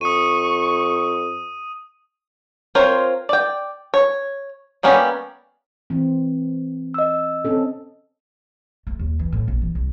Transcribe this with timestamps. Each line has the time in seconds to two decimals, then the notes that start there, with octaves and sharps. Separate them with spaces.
0.01 F2 C#6 D#6 D#7
2.75 C4 F4 A#4 C5 C#5
3.29 D5 G5
3.94 C#5
4.83 G3 A#3 B3 C#4 G4
5.90 E3 C4
6.94 D#5 E6
7.45 C4 C#4 A4
8.87 A3
8.99 D#2
9.19 E3
9.32 A2
9.48 A#1
9.62 E3
9.75 C2